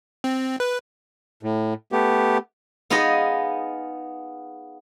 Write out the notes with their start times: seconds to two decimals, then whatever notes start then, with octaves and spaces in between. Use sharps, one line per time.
0.24 C4
0.60 B4
1.43 A2
1.92 A3 B3 G4
2.90 B3 D#4 F4 G#4 D#5